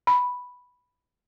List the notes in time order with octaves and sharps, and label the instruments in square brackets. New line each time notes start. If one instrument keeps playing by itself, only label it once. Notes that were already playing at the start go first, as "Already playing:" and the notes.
[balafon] B5